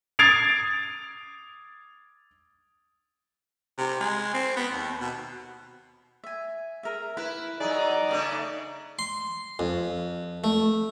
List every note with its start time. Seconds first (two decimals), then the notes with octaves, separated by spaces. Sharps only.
0.19 D#6 G#6 A6 C7 D7 F7
3.78 C3
4.00 G#3
4.34 C4
4.56 B3
4.72 D#2
5.01 B2
6.24 E5 G#5
6.83 G#4 A#4 E5
7.17 E4 B4
7.60 F#3 D#4 G#4 D5
8.09 C#3 A3 D4
8.99 C6
9.59 F2
10.44 A3